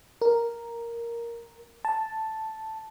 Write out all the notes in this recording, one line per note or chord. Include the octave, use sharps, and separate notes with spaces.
A#4
A5